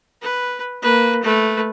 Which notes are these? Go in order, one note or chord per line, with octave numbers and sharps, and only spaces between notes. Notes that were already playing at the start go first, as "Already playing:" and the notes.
B4
A#3 B4
A3 B4